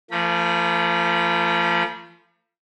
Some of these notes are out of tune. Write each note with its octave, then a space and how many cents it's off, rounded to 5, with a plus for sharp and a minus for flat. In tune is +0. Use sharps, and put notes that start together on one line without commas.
F3 -30 A3 +40 B5 -40